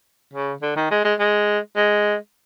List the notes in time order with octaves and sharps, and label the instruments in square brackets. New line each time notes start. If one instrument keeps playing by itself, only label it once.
[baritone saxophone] C#3
D3
D#3
G#3
G#3
G#3
G#3